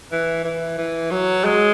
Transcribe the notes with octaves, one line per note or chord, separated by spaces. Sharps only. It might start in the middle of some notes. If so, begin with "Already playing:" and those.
E3
E3
E3
F#3
G#3